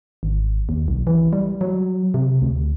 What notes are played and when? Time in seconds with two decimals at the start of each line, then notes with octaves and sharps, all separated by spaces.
0.23 G#1
0.69 D#2
0.88 B1
1.07 E3
1.33 G3
1.61 F#3
2.14 C3
2.42 D2